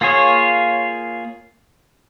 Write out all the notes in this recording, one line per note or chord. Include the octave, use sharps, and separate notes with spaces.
A#3 F4 G#4 C#5